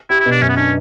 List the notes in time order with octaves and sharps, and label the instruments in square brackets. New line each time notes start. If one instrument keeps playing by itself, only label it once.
[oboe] E4 [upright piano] G4
[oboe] E4
[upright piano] B2
[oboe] D4
[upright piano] F#2 [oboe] C#4
[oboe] B3
[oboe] C#4 [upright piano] D4